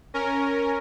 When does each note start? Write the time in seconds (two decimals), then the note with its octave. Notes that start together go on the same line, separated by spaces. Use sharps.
0.14 C#4 A#4